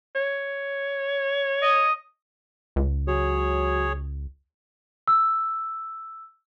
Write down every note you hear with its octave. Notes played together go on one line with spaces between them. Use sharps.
C#5
D#5
C#2
F#3 G#4 C#5
E6